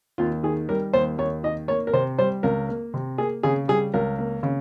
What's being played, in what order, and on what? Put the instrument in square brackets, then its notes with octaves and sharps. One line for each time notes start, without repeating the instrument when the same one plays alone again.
[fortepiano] D#2 F4
D#3 G#4
G3 A#4
D#2 C5
D#2 C#5
D#3 D#5
A#3 C#5
A#4
C3 C5
G3 C5
C#2 A#4
A#3
C3
A#3 G#4
C#3 G#4
G3 G#4
C#2 A#4
A#3
C#3